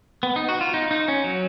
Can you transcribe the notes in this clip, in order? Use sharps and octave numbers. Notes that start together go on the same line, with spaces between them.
B3
D#4
F#4
F4
D#4
D#4
C#4
F#3